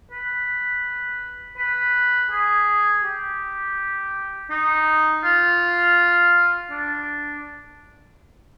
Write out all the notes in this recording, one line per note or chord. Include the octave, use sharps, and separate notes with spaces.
B4
B4
G#4
G4
D#4
F4
D4